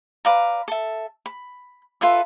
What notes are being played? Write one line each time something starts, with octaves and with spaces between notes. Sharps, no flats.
B4 D5 F5 A#5
A4 E5
B5
F4 A4 B4 E5